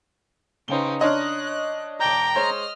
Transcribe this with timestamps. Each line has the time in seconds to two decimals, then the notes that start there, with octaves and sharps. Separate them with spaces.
0.68 C#3 D#4 B4 C5 G5 G7
1.01 D4 C#5 D#5 A#5 C6 F6 F#6
2.00 E1 G5 A5 A#5 D6 G6
2.35 G#3 C5 C#5 D#5 F6